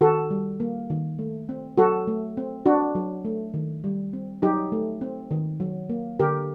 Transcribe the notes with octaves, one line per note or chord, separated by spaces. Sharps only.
D#3 F#4 A4
G3
A#3
D#3
A3
C4
F#3 F#4 A4
A3
C4
C4 D4 F#4
F#3
A3
D#3
G3
C4
F#3 D#4 G4
A3
C4
D#3
F#3
A#3
D3 G4 A#4